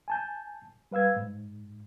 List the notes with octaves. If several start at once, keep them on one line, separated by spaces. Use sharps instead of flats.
G#5 A5 G6
G3 B4 F5 E6 G#6
G#2